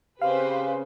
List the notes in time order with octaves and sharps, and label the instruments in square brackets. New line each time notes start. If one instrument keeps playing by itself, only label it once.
[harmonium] C#3 C#4 [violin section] C4 B4 C5 [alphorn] G4 [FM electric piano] F5